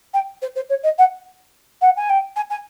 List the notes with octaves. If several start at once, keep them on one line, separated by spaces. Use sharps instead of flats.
G5
C5
C5
C#5
D#5
F#5
F#5
G#5
G5
G#5
G#5